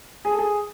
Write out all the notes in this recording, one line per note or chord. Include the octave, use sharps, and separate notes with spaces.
G#4
A4
G#4